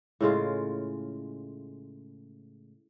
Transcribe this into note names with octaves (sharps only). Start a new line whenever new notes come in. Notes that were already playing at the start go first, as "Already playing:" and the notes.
A2 C#3 G#3 F4